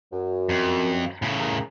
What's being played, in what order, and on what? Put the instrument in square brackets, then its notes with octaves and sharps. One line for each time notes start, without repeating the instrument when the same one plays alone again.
[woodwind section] F#2
[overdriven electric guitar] F2
A2 C#3
[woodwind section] G#4 A#4 A#5